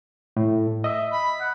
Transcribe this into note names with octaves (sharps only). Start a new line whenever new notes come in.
A2
D#5 E5 D#6
B5
F#5